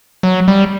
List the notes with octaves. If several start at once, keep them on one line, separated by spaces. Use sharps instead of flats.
F#3
G3